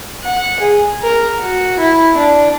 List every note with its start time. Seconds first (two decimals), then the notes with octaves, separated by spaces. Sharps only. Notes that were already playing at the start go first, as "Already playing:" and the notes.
0.23 F#5
0.60 G#4
1.03 A#4
1.39 F#4
1.79 E4
2.18 D4